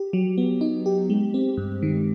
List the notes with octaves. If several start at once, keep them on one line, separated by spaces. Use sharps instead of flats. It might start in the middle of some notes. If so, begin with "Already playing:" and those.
Already playing: G4
F#3
B3
D#4
G4
G#3
C4
G2
D#3